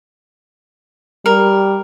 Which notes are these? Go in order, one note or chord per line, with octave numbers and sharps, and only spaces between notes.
G3 A#4